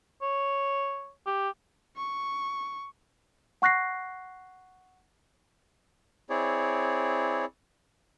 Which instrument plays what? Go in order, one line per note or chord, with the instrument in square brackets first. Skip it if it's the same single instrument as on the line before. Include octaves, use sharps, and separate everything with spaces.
[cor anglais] C#5
G4
[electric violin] C#6
[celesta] F#5 C#6 F#6 A#6 C7
[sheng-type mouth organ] C4 E4 G#4 C#5 D5